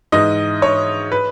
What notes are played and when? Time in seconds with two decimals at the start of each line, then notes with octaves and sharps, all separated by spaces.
0.12 G#2 E3 D#5
0.62 C#5
1.12 B4